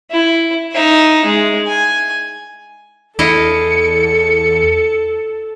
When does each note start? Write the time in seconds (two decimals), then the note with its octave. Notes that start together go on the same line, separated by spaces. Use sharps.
0.11 E4
0.72 D#4 E5
1.25 G#3
1.66 G#5
3.19 E2 E4 A4 D#5 F5 C#7